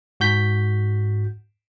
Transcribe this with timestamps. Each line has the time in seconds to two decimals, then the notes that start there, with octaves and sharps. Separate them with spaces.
0.20 G#2 F#4 G6 B6